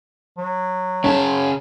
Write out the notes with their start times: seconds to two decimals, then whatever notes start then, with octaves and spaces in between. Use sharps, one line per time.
0.38 F#3
1.04 C#3 C#4 A5